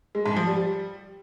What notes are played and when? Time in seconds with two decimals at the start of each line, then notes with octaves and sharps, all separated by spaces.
0.15 G#3
0.26 G#2
0.36 F3
0.47 G3